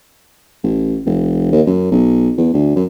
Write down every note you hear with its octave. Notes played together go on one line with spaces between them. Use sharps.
A1
F1
D#2
F#2
B1
E2
D2
F#2